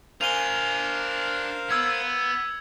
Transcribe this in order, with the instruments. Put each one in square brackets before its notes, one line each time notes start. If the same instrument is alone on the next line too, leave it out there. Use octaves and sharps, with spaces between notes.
[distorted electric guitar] D4 G#5 [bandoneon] A#4 C5 F5 [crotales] F7 G7
[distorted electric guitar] B3 [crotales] E6 G#6